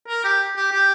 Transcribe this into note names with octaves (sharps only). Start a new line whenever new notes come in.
A#4
G4
G4
G4